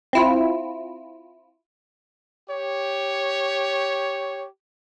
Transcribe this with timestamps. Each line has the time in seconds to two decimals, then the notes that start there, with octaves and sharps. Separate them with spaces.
0.13 C4 E4 F4
2.50 G4 C#5